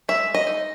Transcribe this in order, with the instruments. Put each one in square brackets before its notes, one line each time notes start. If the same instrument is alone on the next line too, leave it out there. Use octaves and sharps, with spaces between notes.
[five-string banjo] G#3 E5
D#5
D#4